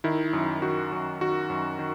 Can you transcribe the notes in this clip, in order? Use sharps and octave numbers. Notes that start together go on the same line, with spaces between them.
D#3 E4
F#2
D#3 F#4
F#2
D#3 F#4
F#2
D#3